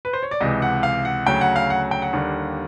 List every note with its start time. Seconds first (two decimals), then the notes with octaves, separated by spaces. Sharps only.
0.05 B4
0.13 C5
0.23 C#5
0.31 D5
0.40 C#2 C3 E3 D#5
0.62 F#5
0.83 F5
1.05 F#5
1.26 D2 C#3 F#3 G5
1.41 F#5
1.56 F5
1.70 F#5
1.91 G5
2.02 F#5
2.13 D#2 D3 G3 A#3